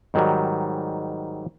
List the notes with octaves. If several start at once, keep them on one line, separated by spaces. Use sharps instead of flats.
G#2 D#3 F#3 G3